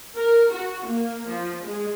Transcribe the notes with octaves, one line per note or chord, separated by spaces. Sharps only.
A#4
F#4
A#3
F3
G#3